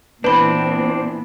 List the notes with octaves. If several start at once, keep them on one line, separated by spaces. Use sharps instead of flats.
A#2 E3 B3 C4 D4 B4 B5